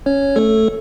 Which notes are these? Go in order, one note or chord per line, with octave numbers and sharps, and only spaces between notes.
C#4 C#5
A3 A4